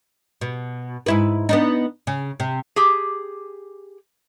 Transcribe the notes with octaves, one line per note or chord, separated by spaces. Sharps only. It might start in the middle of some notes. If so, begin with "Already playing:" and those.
B2
G#2 E4 B4
B3 D4 D#4
C#3
C3
G4 G#4